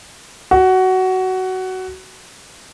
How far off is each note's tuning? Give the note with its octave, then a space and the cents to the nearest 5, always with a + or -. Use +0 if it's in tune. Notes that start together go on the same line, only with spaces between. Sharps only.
F#4 +15